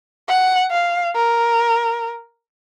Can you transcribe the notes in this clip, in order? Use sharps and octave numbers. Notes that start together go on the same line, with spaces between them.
F#5
F5
A#4